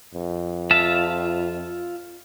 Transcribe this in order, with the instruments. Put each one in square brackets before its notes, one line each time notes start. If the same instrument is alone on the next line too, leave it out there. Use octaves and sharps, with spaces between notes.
[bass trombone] F2
[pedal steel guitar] F4 E5 A5